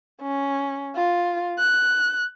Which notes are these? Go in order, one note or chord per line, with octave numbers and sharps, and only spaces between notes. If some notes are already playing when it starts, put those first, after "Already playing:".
C#4
F4
F#6